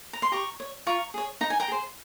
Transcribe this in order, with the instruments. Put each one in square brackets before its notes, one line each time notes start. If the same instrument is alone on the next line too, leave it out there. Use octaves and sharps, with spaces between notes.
[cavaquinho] A#5
C6
G4 A#5 C#6
C#5
F4 A#5 C#6
G#4 C#5
D#4 A#5
G#5
G5 A#5
G#4 C5